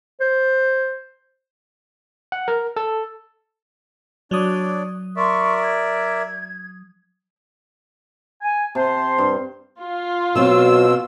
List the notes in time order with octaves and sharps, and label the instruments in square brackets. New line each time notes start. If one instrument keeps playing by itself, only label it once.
[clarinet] C5
[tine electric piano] F#5
A#4
A4
[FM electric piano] F#3 D#6 [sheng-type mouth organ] D4 C#5 D5
[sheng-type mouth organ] A#4 D5 E5 [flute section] C6 C#6
[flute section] G#6
[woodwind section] G#5
[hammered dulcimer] C3 [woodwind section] C5 A5 C6
[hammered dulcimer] G2
[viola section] F4
[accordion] B2 E6 [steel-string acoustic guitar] F#3 C4